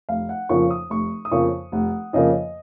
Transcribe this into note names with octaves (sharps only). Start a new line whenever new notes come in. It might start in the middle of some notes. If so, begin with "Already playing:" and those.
F1 F5
F#5
F2 C#3 F3 A#3 C#6
D#6
F1 C#6
D#6
F2 C#3 F3 A#3 C#6
F1 F#5
F2 C#3 F3 A#3 D#5